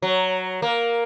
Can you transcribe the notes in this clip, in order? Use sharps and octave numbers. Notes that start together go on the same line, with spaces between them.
F#3
A#3